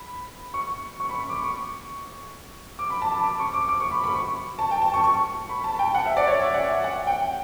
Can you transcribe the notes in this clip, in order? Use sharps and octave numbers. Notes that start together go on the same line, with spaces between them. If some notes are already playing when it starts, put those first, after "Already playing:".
Already playing: B5
C#6
C#6
B5
C#6
D6
C#6
D6
B5
A5
B5
D6
C#6
D6
D6
C#6
B5
B5
C#6
A5
G5
A5
C#6
C#6
B5
A5
G5
F#5
E5
D5
C#5
E5
F#5
E5
F#5
G5